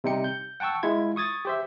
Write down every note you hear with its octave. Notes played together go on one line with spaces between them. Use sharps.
C3 G3 D#4 G5 C#7
G6
F#5 G5 A5 C#6 E6
G#3 E4 F4 G#6
C#6 D#6 G#6 A6
G4 C5 E5